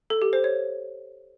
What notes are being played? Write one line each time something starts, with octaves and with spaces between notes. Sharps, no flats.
A4
G4
C5
C#5